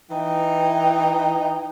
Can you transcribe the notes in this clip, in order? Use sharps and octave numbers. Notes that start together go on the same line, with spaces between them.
E3 D#4 G5